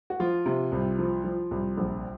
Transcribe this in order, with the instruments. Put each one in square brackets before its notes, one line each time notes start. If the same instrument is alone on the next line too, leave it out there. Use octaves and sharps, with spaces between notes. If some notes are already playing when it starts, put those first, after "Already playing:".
[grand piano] F#4
F3 F4
C3
C2
F3
F3
C2
A#1